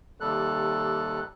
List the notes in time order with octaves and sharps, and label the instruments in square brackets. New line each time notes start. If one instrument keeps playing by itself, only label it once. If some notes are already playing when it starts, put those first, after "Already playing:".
[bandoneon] D#2 C3 G3 A4 F#6